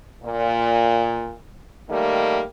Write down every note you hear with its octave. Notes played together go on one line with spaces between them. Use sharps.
A#2
D#3 G3 A3 A#3